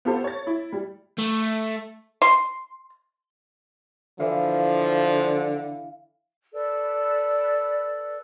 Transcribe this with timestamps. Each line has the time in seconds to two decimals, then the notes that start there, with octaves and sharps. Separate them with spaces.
0.05 B3 F4 G4 A4 C5
0.24 C#5 A6
0.47 E4
0.72 G3
1.19 A3
2.22 C6
4.20 D3 E3 F3 E5 F5
6.51 A4 B4 D5